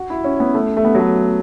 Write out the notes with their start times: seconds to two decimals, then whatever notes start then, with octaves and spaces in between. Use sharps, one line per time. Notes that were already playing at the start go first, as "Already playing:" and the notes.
Already playing: F#4
0.10 E4
0.24 C#4
0.40 B3
0.54 A3
0.77 A3
0.85 B3
0.95 F#3
1.00 A3